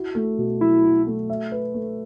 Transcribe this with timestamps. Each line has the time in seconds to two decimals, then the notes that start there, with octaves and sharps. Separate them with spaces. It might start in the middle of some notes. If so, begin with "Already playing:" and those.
Already playing: E4 F#4
0.15 A3
0.38 B2
0.61 F#3 E4
0.84 F#4
1.07 A3
1.30 E5
1.52 B4
1.74 A3